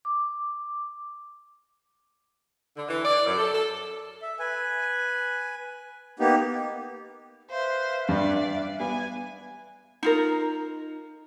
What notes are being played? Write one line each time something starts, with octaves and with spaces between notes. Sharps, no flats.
D6
D3
E3
D5
F#2
A4
A4
E5
B4 G#5
A#3 B3 D#4 G4
B4 C5 E5 F5
G2 D5
B3 G#5
D#4 F4 A#4